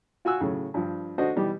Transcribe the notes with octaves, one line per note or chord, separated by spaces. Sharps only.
F4 F#4 G#5 E6 F#6
A2 C#3 F#3
G2 F3
A3 D4 F#4 C5 D#5
B2 E3 G3 B3 G4